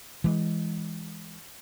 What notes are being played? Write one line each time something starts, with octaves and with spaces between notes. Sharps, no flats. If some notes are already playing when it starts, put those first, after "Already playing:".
E3 G#3